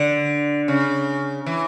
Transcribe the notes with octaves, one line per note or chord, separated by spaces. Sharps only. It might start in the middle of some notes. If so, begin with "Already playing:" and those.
Already playing: D3
C#3
E3